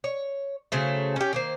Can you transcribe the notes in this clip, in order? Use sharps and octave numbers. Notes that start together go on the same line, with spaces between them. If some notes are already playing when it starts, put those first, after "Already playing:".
C#5
C#3 F#3 A3 C5
C#4 G4
D#3 A#3 C5